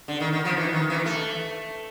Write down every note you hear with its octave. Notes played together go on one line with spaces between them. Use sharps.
D3
D#3
D#3
F3
E3
D#3
E3
A3